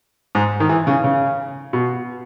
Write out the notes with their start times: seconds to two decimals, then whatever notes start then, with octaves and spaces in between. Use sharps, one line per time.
0.35 G#2
0.60 D#3
0.69 E3
0.87 C#3
1.04 C#3
1.73 B2